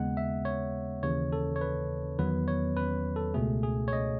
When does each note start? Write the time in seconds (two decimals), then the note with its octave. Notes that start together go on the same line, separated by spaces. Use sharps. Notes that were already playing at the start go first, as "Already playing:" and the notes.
Already playing: D#2 C#3 G#3 B3 F#5
0.17 E5
0.45 C#5
1.03 D#2 C#3 E3 C#5
1.33 A4
1.56 C#5
1.61 B4
2.19 E2 D#3 F#3 B3 B4
2.48 C#5
2.77 B4
3.16 A4
3.34 C#2 B2 A3 G#4
3.63 G#4
3.88 C#5
3.93 D#5